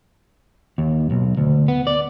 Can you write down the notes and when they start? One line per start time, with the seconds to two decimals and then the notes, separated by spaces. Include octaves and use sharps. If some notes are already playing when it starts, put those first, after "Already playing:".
0.78 D#2
1.11 B1
1.37 D2
1.68 B3
1.87 D5